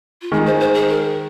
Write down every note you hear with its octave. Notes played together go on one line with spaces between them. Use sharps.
F4
D#3 G#3 G#4
C5
C5
G#4
A#4